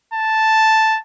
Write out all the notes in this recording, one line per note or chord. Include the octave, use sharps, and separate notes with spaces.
A5